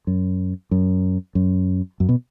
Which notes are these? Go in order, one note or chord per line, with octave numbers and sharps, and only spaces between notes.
F#2
F#2
F#2
F#2
B2